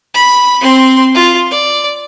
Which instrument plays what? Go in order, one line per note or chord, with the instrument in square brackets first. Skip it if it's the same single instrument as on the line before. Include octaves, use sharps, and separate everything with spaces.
[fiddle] B5
C4 C6
F4
D5